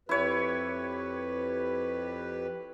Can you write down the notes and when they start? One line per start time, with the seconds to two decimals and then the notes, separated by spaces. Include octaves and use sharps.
0.09 F2 E4 G4 B4 C#5